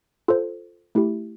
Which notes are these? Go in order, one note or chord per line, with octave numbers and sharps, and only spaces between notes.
F4 A4 C5
A3 E4 G4